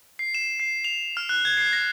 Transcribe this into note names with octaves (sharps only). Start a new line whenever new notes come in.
C7
E7
C7
F7
F6
F#6
G#6
C7
A#6